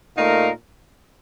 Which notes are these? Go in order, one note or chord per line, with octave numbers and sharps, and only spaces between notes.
A#2 A3 D#4 A#4 F5